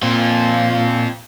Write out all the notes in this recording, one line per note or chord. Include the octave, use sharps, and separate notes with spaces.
A#2 C4 F4